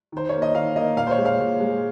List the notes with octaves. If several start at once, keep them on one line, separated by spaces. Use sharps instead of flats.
D#3 C5
A#3 C#5
D#5
D#3 F5
A#3 D#5
A#2 F5
C5
C#5
G#3
F5
A#2
G#3